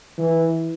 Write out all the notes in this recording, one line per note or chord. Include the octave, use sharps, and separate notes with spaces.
E3